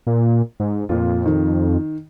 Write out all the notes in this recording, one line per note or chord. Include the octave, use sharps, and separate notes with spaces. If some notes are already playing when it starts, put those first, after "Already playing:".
A#2
G#2
F2 A#2 F4
D#3